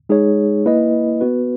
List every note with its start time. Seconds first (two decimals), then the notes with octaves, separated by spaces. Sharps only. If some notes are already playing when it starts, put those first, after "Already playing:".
0.09 G#3 D#4 G#4 C#5
0.66 A#3 E4 B4 D#5
1.21 B3 F#4 B4